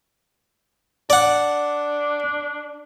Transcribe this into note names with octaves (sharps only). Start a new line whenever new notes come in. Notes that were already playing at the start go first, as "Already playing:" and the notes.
D4 D5 F#5